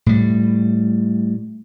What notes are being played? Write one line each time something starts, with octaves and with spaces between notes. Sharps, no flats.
A2 G3